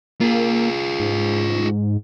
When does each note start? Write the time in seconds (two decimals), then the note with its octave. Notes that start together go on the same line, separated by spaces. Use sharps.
0.21 A#3 F4 G#4
1.00 G#2